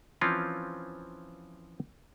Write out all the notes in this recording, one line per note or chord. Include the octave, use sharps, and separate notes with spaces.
E3 F3 C4 C#4 F4